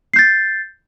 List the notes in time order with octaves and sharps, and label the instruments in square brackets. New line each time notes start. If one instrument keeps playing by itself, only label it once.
[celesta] C7
G6
A6